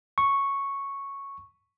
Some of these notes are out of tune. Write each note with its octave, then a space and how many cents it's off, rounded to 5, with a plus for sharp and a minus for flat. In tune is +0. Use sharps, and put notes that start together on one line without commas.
C#6 -5